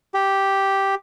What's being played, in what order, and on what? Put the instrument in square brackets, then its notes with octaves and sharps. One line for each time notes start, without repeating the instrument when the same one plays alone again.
[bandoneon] G4